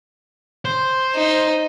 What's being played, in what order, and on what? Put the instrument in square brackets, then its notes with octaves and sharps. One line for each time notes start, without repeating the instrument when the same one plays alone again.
[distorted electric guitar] C5
[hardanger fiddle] D#4